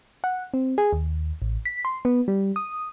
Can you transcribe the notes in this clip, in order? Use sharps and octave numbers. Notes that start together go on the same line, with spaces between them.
F#5
C4
G#4
D#2
A1
B6
C6
B3
G3
D#6